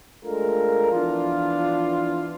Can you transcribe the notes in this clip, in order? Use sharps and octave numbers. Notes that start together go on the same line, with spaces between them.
G#3 A3 D4 F4 A4 A#4
E3 F3 B3 D4 E4 F4